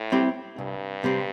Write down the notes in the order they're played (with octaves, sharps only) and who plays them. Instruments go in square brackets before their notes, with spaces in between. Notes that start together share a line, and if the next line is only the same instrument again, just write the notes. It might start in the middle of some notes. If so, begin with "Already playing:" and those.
Already playing: [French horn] A2
[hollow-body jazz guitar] G3 C4 E4 G4
[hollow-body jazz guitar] C2 [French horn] G2
[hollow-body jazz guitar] C3 G3 C4